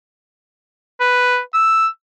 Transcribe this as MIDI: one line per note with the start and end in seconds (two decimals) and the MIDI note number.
1.00 1.39 71
1.54 1.87 88